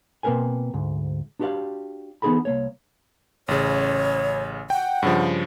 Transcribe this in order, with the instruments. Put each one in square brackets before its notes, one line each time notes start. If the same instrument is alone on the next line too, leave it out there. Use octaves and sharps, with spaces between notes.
[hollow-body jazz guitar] B2 A#3 C4 A#4 B4 G#5
D2 G#2
D4 F#4 G4 B4 D5 F5
E3 B3 D#4 G#4 A4 B5
C2 A#3 C#5
[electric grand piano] A1 C#3 [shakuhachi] C#5
[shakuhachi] F#5 [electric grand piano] G5
[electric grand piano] G2 C#3 F3